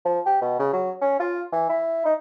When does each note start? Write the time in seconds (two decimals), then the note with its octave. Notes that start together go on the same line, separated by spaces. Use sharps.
0.05 F3
0.26 G4
0.41 B2
0.59 C#3
0.73 F#3
1.01 C#4
1.20 F4
1.52 E3
1.69 E4
2.05 D#4